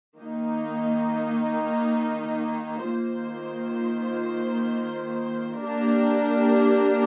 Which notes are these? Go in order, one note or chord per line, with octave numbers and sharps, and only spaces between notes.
D#3 A#3 D#4
D#3 A#3 F4 C5
A#3 D4 G4 A#4